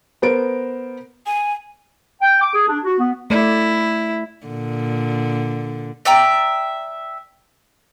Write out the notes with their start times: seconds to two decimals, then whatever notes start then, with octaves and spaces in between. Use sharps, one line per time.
0.22 B3 A#4 C5 D7
1.26 G#5
2.22 G5
2.41 D6
2.54 G#4
2.68 D4
2.85 F#4
3.00 B3
3.30 A3 E4 D5
4.46 A#2 D3
6.05 D5 E5 G5 A#5